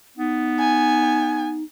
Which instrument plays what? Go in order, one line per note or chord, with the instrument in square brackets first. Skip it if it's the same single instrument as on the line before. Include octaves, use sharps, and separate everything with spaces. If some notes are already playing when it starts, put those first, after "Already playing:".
[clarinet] B3 [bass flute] D#4
[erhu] G#5